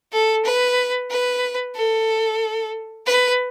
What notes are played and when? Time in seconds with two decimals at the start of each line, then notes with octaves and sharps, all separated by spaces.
0.12 A4
0.45 B4
1.10 B4
1.76 A4
3.06 B4